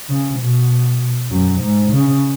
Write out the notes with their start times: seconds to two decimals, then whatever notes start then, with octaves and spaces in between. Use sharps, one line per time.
0.09 C#3
0.39 B2
1.30 F#2
1.60 G#2
1.91 C#3